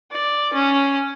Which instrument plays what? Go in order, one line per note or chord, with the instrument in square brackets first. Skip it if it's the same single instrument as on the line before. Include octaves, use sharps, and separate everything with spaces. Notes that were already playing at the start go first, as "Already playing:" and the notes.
[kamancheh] D5
C#4